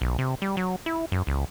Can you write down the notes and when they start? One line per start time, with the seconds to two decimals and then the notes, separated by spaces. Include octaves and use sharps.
0.01 B1
0.18 C3
0.42 G3
0.57 F#3
0.86 E4
1.12 F#2
1.27 C#2